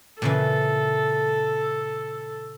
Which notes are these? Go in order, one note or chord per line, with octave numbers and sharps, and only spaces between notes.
A#2 C#3 E3 A4